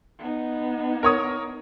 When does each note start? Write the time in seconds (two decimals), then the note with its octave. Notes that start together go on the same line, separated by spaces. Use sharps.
0.19 B3 D#4
1.03 A#4 C#5 D#6